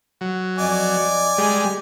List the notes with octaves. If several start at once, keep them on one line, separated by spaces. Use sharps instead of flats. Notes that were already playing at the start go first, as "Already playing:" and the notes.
F#3
F2 D5 D#5 G#5 D6
G3 G#3